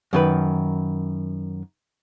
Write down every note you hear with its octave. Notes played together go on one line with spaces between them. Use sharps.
F#2 D#3 B4